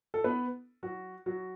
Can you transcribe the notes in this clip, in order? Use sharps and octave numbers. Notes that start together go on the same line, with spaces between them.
A4
B3 B4
F#3 F#4
F#3 F#4